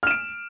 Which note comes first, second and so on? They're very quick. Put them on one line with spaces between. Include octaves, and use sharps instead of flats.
F6 E7 D7